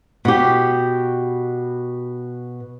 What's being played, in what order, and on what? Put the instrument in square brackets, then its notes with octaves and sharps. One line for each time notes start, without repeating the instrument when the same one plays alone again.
[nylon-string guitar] B2 G4